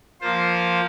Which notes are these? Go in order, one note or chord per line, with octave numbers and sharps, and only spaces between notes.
F3 A#3 F4 C5